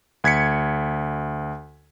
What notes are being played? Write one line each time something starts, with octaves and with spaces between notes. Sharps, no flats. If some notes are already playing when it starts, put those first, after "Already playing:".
D2 G#6 B6 C#7